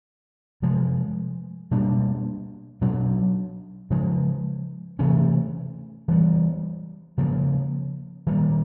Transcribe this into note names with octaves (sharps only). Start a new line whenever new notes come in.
C3 F3 G#3
B2 G3 A#3 D4
B2 F#3 B3 D4
C#3 F3 G#3
C3 E3 A3 C#4
E3 G3 B3
C#3 F3 A#3
D#3 G3 A#3